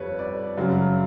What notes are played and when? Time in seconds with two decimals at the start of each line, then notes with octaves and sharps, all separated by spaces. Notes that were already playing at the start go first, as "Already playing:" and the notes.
Already playing: F2 G3 B4 C#5
0.19 D5
0.58 F#2 C#3 F#3